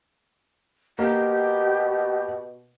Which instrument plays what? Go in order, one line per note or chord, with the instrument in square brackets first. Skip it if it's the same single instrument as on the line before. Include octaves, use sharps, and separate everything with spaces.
[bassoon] B2 [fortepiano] A#3 [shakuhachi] G4